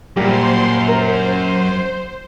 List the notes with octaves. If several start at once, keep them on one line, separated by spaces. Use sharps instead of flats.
F#2 A#2 G3 A#3 G4 C5 C6
A#4 C5